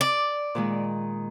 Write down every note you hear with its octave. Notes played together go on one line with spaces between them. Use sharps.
D5
A#2 D#3 G#3